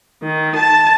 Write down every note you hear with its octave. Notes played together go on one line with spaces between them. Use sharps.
D#3
A5